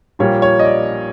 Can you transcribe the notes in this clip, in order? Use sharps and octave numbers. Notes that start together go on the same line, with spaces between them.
A#1 A#2 G3 A#3 C#5
C#5
D#5
D5